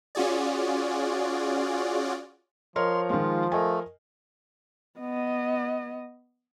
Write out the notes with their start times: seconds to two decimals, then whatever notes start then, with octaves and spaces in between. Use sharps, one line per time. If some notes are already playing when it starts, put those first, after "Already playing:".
0.15 C#4 F4 F#4 G#4 D5
2.76 F3 A#4 C#5 D#5 C6
3.10 D#3 G#3 F4
3.52 A3 A#4 D#5 G#5
4.99 B3 D#5